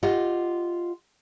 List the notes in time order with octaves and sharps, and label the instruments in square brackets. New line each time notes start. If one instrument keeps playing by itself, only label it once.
[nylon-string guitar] F4 G4 D#5 F#5